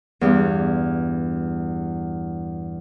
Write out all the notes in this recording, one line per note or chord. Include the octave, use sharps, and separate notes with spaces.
E2 G2 G3 B3